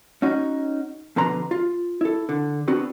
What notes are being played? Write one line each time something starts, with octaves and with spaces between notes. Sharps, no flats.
C#4 D#4 F#4
F2 B2 D3 B4 A#5 C6
F4
E4 A4
D3
B3 C4 D4 F#4